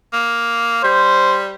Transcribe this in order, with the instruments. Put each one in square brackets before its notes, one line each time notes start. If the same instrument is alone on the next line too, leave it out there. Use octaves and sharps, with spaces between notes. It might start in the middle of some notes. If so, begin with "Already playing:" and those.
[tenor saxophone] A#3
[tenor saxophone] G3 [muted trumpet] C5